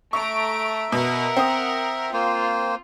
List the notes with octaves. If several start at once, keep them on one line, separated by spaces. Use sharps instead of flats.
A3 E5 A#5 C#6 D7
B2 A#4 F#5
C4 D#6
A#3 F4 C5